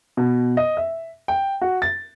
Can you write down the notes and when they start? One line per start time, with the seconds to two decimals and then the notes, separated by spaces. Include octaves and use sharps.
0.17 B2
0.57 D#5
0.77 E5
1.28 G5
1.61 F#4
1.82 A6